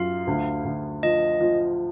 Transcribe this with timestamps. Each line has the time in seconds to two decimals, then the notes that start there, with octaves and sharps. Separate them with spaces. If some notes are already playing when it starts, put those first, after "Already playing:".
Already playing: F#2 F4 F5
0.27 D2
0.65 D2
1.03 F3 D#5
1.41 F3